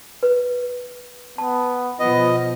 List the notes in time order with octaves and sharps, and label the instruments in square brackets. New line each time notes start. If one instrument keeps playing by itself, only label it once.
[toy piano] B4
[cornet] B3 [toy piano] A5
[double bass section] B2 F3 [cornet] B3 [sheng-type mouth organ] D#5